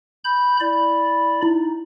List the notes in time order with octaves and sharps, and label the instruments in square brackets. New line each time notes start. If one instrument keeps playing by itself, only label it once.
[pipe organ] B5 G6
E4 D5 B5
[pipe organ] D#4 [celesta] E4